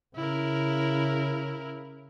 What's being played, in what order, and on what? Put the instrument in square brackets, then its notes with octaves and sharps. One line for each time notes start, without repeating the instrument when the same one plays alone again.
[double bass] C#3 [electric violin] E4 A#4